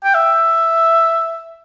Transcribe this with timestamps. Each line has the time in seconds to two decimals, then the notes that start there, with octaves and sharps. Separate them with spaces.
0.04 G5
0.14 E5